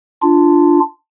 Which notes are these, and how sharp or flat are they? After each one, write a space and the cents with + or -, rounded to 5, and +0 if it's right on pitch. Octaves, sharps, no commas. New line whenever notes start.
D4 +5 F4 -10